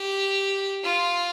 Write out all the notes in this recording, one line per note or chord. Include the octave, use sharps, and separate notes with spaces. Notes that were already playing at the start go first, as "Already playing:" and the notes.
Already playing: G4
F4